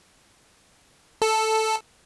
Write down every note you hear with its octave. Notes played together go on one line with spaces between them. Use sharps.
A4